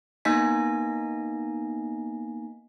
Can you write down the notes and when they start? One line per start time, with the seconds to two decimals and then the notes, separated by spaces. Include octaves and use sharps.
0.25 A#3 B3 D#4 D#5 G#5 B6